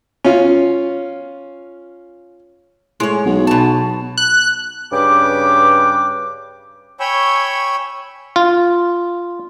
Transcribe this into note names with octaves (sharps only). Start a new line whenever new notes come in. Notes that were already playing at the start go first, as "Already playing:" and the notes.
C#4 F4
A2 G#3 C#5
B1
B2 A5
F#6
G2 C#3 B4 G5 D6
C#5 G5 G#5 B5 C#6 E6
F4